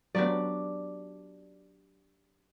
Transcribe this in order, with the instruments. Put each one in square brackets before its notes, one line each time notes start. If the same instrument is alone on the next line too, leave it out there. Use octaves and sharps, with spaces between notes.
[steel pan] F#3 B3 [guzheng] D4 F#4 G4 [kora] D5